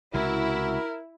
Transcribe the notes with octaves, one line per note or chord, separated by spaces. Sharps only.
C#2 C3 E4 F#4 A#4